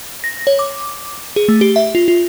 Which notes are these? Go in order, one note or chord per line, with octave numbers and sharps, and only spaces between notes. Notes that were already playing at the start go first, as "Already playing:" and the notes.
A#6
C#5
D6
G#4
A3
G4
E5
F4
F4